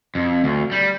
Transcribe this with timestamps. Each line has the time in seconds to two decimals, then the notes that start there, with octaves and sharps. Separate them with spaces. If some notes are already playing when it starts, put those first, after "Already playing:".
0.15 F2
0.44 D2
0.72 G3